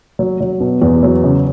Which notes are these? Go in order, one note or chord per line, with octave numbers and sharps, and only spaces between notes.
F#3
F#3
B2
E2
F#3
C#3